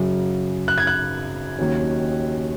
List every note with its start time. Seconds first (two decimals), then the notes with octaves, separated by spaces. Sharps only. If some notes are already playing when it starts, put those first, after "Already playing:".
Already playing: F#2 C#3 F#3
0.68 F#6
0.78 G#6
0.87 F#6
1.59 D#2 D#3 F#3 C#4